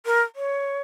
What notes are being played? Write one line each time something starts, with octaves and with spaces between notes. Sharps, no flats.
A#4
C#5